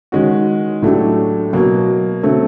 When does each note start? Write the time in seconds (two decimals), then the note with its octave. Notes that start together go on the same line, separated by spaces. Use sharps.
0.12 D#3 G#3 C#4 F#4
0.82 A2 F#3 A3 D4 G4
1.53 B2 F#3 A#3
2.23 D3 F#3 A3 C4